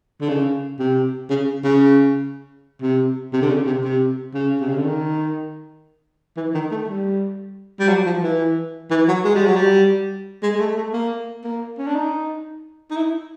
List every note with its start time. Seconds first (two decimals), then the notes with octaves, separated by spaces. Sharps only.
0.21 D3
0.29 C#3
0.79 C3
1.30 C#3
1.64 C#3
2.82 C3
3.33 C3
3.42 D3
3.49 C#3
3.66 C3
3.83 C3
4.34 C#3
4.60 C3
4.69 C#3
4.77 D3
4.85 D#3
6.37 E3
6.54 D#3
6.71 A3
6.88 G3
7.79 G3
7.89 F#3
8.06 F3
8.23 E3
8.91 E3
9.08 F#3
9.24 G#3
9.35 G3
9.46 F#3
9.56 G3
10.43 G#3
10.55 G#3
10.59 A3
10.77 A3
10.93 A#3
11.44 A#3
11.78 C#4
11.87 D4
11.95 D#4
12.91 D#4
12.96 E4